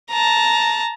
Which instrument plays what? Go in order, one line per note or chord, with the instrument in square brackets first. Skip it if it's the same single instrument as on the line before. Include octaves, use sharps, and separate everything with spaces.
[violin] A5 A#5